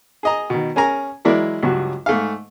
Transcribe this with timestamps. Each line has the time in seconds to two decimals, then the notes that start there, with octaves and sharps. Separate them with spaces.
0.23 G#4 D#5 A#5
0.50 B2 D#3
0.76 C#4 G#4 A#4 G#5 A#5
1.25 E3 F#3 G#3 E4 A#4 D5
1.63 C#2 G2 F#3 F#4
2.06 G#2 A3 G#4 F5